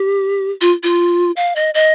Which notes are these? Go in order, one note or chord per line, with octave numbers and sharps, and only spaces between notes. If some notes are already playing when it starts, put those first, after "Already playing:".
Already playing: G4
F4
F4
F5
D#5
D#5